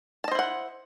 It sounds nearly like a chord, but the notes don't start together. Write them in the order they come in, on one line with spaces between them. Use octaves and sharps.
A5 D#5 C5 E4 F#5